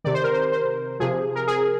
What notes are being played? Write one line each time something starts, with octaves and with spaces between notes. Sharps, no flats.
C3 D#3 D5
C5
A#4
C5
C5
C3 F3 G#4
A#4
G#4